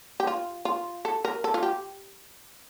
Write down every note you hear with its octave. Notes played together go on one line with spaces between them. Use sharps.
G4
F4
F4
A4
A#4
A4
F4
G4